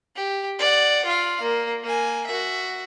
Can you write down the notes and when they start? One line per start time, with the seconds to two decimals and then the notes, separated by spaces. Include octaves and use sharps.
0.16 G4
0.59 D5 F#5
1.05 F4 F5
1.41 A#3
1.83 A#3 G#5
2.26 F#4 E5